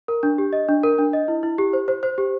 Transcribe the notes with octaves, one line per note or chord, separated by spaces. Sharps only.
A#4
D4
G4
D#5
D4
A#4
D4
D#5
E4
E4
G4
C5
C5
C5
G4